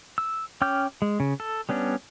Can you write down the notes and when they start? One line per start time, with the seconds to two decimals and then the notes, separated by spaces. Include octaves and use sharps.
0.18 E6
0.62 C#4 G5 D6 F6 G6
1.02 G#3
1.20 C#3
1.40 A4
1.69 G3 B3 C#4 D4